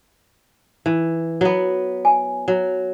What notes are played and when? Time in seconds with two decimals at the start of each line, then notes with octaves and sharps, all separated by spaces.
0.86 E3
1.41 F#3 B3
2.05 G#5
2.48 F#3